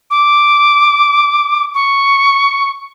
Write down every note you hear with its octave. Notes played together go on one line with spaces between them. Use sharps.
D6
C#6